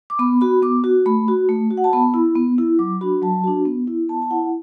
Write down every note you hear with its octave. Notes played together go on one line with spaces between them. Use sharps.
D6
B3 B5
F#4 B5
B3 D6
F#4
A3 B5
F#4
A3
F#4
F#5
A5
B3 B5
E4
B3
E4
F#3 D6
D4 F#4 B5
F#3 A5
D4 F#4
B3
E4
B3 A5
A5
E4 F#5